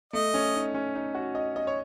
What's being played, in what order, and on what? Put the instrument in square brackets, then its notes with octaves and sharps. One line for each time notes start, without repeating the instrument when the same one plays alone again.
[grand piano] A3 [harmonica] D#5
[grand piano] C#4
D#4
C#4
D#4
F#4
D#5
D#5
C#5